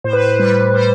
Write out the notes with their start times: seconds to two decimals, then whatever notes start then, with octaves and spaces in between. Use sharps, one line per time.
0.04 A2 C5
0.13 B4
0.20 C5
0.39 G3 B4
0.74 G3 C5